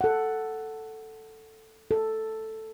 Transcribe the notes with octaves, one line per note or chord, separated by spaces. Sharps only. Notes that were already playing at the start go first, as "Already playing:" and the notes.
A4 F#5
A4